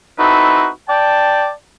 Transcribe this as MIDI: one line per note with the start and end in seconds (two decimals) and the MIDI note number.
0.18 0.67 60
0.18 0.67 63
0.18 0.67 64
0.18 0.67 66
0.18 0.67 69
0.18 0.67 71
0.89 1.50 74
0.89 1.50 79
0.89 1.50 81